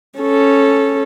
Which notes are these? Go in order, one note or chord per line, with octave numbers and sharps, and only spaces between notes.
C#4 A4